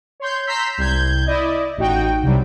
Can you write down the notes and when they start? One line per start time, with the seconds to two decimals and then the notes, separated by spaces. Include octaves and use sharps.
0.20 C#5 C6 G6
0.47 A#5 C6 E6 G6 B6 C7
0.78 C2 G6 G#6
1.26 E4 D5 D#5
1.77 A1 D#4 F#4 G5
2.22 C2 C3 F#3 G3